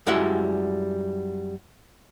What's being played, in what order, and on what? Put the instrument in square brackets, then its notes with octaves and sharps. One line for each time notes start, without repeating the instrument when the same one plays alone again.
[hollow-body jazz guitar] F#2 G3 G#3 E4 F#5